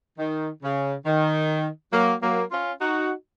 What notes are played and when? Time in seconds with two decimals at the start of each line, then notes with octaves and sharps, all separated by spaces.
0.18 D#3
0.63 C#3
1.06 D#3
1.93 F#3 A#3
2.22 F#3 A#3
2.51 C#4 F4
2.80 D#4 F#4